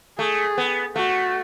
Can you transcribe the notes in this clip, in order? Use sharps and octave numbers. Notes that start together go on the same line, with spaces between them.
A3 G#4
B3
A3 F#4